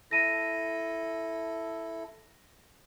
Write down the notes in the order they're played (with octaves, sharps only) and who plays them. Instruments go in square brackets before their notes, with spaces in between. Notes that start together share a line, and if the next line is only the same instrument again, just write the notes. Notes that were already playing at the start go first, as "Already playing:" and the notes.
[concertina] E4 A4 [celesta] A#6 D#7